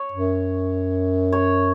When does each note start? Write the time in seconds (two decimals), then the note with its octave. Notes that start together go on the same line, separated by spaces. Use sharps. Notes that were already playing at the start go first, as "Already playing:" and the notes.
Already playing: C#5
0.12 F#2
1.32 C#5